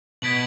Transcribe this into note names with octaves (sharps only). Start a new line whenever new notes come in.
B2 G#6 B6 D7 F#7